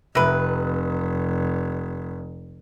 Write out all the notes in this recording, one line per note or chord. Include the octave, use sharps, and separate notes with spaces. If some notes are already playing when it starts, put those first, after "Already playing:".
F1 C3 B4